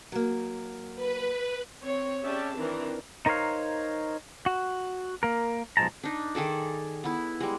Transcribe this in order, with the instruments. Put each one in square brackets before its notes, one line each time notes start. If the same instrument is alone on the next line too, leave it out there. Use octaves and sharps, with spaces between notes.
[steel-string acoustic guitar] F#3 A#3
[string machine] B4
[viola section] C4 C#5
C#4 G4 G#4 D5 E5 A5
D#3 E3 C4 D4 A#4
[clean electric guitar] D#4 A#4 C5 C#5 F5
F#4
A#3 A#4
B1 F3 F#3 G#3 A5 A#5
[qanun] D4 D#4
D#3 G#4 A4 D5
B3 E4
G3 G#3